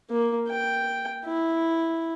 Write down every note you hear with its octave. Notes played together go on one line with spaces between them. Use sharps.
A#3
G5
E4